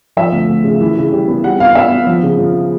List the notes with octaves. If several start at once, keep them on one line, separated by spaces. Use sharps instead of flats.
F3 E5
D2
D2
C#3
E3
C#3
G3
B3
G3 F#5
B3 F5
B3 E5
B3
F3
C#3
F3